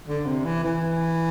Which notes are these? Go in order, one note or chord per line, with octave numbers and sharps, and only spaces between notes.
D3
C3
E3
E3